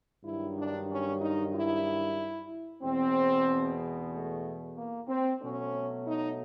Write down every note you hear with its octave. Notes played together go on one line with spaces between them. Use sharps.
G2 D#3 F#3 E4
D4
C#4
D#4
E4
E2 B2 G#3 C4
A3
A#3
C4
B2 F#3 A3 C#4
D#4